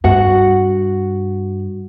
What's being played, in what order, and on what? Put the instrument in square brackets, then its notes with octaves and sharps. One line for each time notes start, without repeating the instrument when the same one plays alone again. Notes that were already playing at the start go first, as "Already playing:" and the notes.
[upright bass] G2 [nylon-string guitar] F#4 F#5